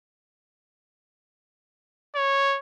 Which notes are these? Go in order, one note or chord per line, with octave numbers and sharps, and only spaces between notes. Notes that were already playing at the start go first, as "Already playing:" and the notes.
C#5